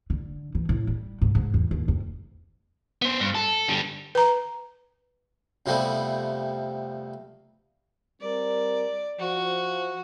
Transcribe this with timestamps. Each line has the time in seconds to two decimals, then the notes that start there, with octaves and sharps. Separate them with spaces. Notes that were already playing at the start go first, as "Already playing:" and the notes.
0.10 D3
0.55 E3
0.69 A2
0.87 G3
1.21 G#2
1.35 G#2
1.54 E2
1.71 D#2
1.88 F2
3.02 B3 C5
3.20 G2
3.35 A4
3.69 D3 G3
4.15 B4 A#5
5.66 F2 C3 F3 G3 A3 B3
8.21 G3 C4 A#4 D5
9.19 F3 F#4